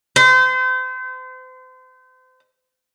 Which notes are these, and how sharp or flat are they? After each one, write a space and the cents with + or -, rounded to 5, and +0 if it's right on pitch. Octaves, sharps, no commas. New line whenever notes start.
C5 -35